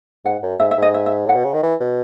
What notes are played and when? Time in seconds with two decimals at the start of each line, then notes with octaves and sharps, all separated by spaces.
0.25 G#2 F#5
0.43 F#2
0.60 G#2 E5
0.71 E5
0.78 G#2 D#5
0.94 E5
1.06 E5
1.26 A2 F#5
1.35 B2
1.44 C#3
1.54 D#3
1.63 E3
1.80 B2